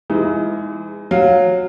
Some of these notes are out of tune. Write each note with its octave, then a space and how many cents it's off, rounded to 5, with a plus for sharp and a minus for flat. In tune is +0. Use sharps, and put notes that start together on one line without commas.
E3 +35 G#3 -20 D#4 +30
F#3 -10 F5 +5